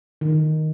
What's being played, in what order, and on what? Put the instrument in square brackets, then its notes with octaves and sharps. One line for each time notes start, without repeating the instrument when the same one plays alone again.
[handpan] D#3